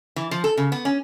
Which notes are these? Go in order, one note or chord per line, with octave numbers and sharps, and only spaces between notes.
E3
F3
A4
C#3
B3
C#4